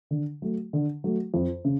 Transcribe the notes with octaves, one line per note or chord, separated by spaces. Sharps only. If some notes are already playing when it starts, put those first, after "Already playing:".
D3
F#3 A3
D3
F#3 A3
F2
C#3